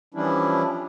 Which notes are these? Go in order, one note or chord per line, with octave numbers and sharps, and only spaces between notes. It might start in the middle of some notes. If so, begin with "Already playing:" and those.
E3 F3 G3 C#4 D4 E4